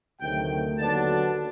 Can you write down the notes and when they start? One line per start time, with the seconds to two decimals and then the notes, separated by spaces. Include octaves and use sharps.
0.20 D2 C3 D#3 F#3 A3 G5
0.78 D#2 D3 F#3 B3 D4 A5